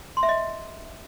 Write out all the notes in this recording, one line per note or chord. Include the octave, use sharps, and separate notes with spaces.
C6
E5
D#5